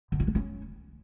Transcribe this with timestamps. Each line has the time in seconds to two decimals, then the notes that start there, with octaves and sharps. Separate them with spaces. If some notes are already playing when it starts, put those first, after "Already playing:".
0.12 D3
0.20 F4
0.27 D4
0.35 C#4